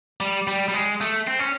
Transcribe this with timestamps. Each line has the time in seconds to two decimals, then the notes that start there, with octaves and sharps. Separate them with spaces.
0.20 G3
0.47 G3
0.68 G3
0.74 G#3
1.01 A3
1.27 C4
1.39 C#4